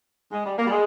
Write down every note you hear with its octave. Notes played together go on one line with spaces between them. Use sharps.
G#3
G3
A#3
G3
G#3